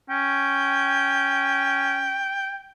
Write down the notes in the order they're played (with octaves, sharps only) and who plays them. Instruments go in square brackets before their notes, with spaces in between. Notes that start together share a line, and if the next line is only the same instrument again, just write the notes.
[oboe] C#4 [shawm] G5